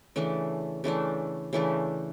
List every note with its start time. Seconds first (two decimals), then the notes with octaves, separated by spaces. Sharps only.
0.16 C#3 E3 A3 D4
0.84 C#3 E3 A3 D4
1.53 C#3 E3 A3 D4